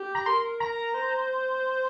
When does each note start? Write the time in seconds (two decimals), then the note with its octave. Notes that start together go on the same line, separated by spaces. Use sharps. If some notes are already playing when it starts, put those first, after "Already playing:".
Already playing: G4
0.15 A#5
0.26 A#4 C6
0.60 A#5
0.94 C5